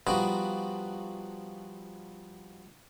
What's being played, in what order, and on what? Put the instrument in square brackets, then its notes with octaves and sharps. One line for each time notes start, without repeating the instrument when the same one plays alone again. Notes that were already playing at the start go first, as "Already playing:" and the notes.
[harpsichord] F3 G3 B3 D4 D#4 F#4